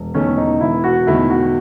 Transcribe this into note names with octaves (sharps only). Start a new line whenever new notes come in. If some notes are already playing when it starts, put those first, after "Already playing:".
Already playing: E1
E2 D#3 A3 C#4
D#4
E1 E4
F#4
E2 D#3 A3 E4
F#4